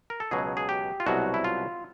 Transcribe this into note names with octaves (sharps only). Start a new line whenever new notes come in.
A#4
A4
C#2 B2 F#3 G#4
G#4
G4
F4
C2 B2 F#3 F#4
E4
F4